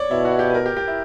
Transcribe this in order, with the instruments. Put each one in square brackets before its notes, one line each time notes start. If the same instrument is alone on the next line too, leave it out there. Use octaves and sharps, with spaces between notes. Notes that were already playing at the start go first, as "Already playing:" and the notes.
Already playing: [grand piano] C#5 D5
[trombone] B2 [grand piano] E4
[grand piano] F#4
G4
B4
A#4
G4
G4
E4